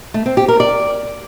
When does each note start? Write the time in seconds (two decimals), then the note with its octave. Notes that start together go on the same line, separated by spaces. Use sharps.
0.14 A3
0.26 C4
0.37 G4
0.48 A#4
0.60 D5